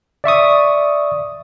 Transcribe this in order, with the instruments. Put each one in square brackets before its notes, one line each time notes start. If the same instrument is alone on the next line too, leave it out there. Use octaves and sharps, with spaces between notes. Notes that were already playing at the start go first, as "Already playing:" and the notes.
[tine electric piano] D5 E5 C#6 D#6